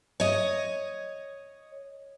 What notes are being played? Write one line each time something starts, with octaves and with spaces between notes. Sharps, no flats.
C#5 D#5